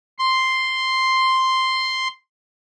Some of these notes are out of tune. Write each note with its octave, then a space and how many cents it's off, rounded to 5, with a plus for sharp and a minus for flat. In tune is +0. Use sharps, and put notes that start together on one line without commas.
C6 +0